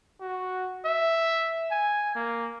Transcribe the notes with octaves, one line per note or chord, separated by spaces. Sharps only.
F#4
E5
G#5
A#3